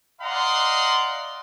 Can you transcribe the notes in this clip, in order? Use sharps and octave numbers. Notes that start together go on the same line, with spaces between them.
D5 D#5 F5 F#5 A#5 C6